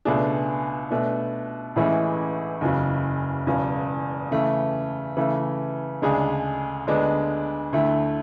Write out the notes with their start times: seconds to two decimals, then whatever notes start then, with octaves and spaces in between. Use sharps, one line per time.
0.05 C#2 B2 A3 D4 G#4
0.91 B2 A3 D4
1.76 A1 A2 E3 G#3 C#4
2.61 F#1 E2 C#3 F#3
3.47 E1 E2 C#3 F#3
4.32 C#3 E3 A3
5.17 C#3 E3 A3
6.02 D2 C#3 G#3 D4 G#4
6.87 D2 D3 G#3 B3 D4
7.73 D2 D3 A3 E4